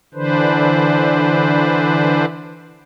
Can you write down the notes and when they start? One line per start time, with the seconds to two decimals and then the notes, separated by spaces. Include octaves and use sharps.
0.14 D3 E3 D4 B4 C5